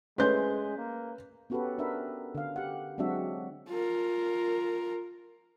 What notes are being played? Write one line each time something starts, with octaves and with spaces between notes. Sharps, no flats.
G#3 A3 C#4 B4 C5 G6
A#3
B3 C#4 F#4 G4 A4 B4
D4 A#4 B4 E5
D3 F5
G4 F#5
F#3 G#3 C4 D4 F#4 E5
F4 A#4